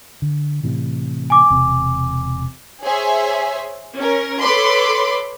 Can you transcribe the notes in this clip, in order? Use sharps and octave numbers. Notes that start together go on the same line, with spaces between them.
D3
A2 C3 E3
G#5 D6
E1 C3
G#4 C5 C#5 E5 G#5
C#4 A#4
A4 B4 C#5 B5 C6 D6